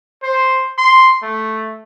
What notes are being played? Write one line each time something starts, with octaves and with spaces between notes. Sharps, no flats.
C5
C6
A3